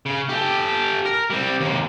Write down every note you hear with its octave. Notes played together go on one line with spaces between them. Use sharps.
C#3
G4 A4
A#4
G3 C4
D#2 C3